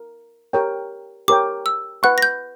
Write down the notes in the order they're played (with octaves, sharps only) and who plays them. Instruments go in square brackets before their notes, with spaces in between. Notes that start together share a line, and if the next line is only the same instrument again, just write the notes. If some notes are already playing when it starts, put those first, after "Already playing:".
Already playing: [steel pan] A#4
G4 A#4 C#5 G5
[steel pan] G4 A#4 C#5 G5 [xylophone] D6
[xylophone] E6
[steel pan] B4 F#5 C#6 [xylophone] F#6
[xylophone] A#6
G6